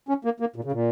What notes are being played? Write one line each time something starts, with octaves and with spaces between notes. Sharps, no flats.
C#4
A#3
A#3
A#2
C#3
A#2